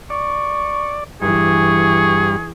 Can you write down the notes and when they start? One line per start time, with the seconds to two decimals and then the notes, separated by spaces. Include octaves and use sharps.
0.10 D5 C#6
1.22 G2 E3 G#4 C#6